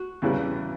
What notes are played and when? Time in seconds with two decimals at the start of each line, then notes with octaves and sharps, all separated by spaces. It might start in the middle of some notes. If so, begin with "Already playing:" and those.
Already playing: F#4
0.22 E2 C#3 E3 G3